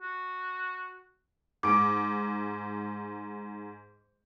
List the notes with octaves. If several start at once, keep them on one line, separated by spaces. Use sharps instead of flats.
F#4
G#2 D6 D7